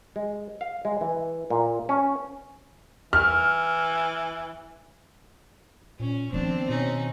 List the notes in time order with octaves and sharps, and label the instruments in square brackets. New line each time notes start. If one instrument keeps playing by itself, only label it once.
[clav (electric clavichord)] G#3
F5
G#3
E3
A#2
C#4
[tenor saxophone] E3 [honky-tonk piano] F6
[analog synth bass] A#2 [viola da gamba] C#4
[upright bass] D#3 B3 [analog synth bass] F3 [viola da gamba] C4 [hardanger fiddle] D4
[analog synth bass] B2 [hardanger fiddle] C#4 D#4